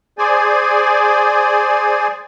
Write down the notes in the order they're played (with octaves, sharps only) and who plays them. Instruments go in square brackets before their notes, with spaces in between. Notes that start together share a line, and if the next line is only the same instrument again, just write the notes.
[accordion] G#4 C5 D5 G#5